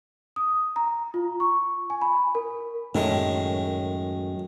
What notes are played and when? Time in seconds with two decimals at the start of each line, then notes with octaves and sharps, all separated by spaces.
0.36 D#6
0.76 A#5
1.14 F4
1.40 C#6
1.90 G#5
2.01 B5
2.35 A#4
2.95 F#2 A2 D#3 G#3